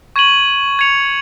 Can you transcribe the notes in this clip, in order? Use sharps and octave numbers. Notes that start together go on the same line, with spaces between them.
C#6 G#6 D#7 F#7
G#6 C#7 F7